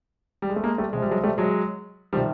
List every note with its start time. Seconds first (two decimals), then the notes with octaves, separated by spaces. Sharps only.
0.42 G3
0.50 G#3
0.56 A3
0.64 G#3 A#3
0.78 G3 A3
0.93 C3 F3 G#3
1.02 G3
1.11 F#3 G#3
1.24 G3 A3
1.38 F#3 G#3
2.13 D#3 F3 G3
2.17 C3